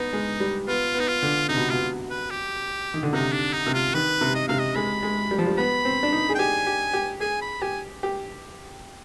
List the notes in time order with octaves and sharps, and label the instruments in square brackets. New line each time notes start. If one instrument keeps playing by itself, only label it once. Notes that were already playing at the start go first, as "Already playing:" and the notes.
Already playing: [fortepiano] B3 [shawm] D#4
[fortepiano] G#3
G3
[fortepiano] B3 [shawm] F4
[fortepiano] B3 [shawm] D#4
[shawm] F4
[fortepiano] D3
[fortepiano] C3 [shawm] D#4
[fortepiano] B2
[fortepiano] B2 [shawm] F4
[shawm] B4
G4
[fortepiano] D#3
D3
[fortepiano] C3 [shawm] D#4
[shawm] D4
D#4
[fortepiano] C3
[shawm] F4
[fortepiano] D#3 [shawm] B4
[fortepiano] C3
[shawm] D#5
[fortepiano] C3 [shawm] F5
[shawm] D#5
[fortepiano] G#3 [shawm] B5
[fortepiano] G#3
G3
F3
G3
[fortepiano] B3 [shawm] B5
[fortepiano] C4
D4
D#4
G#4
[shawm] G5
[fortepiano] G4 [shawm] G#5
[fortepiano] G4
G4
[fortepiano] G#4 [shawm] G#5
[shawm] B5
[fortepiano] G4 [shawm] G#5
[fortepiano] G4